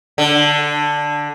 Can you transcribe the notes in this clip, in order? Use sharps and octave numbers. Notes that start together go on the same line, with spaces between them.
D3